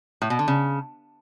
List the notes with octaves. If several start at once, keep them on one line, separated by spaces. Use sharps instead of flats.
A2
B2
D3
C#3